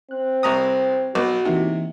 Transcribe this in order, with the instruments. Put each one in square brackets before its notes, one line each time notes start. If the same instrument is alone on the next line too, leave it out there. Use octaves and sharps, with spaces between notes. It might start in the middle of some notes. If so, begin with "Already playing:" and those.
[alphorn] C4 [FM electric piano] F#6
[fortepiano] C2 A#5 D#6
[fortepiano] B1 [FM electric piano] B3 [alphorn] F#4
[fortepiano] C3 [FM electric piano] E3 A#3 D#4